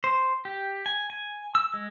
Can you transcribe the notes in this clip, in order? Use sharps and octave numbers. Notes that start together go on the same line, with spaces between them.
C5
G4
G#5
G#5
E6
G#3